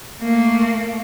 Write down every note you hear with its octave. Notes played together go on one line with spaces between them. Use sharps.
A3 A#3